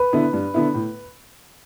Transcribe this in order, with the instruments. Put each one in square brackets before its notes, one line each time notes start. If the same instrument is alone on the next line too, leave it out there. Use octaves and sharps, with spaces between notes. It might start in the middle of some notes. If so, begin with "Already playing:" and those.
Already playing: [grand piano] B4
[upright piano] D3 B3 E4
G2
D3 B3 E4
A2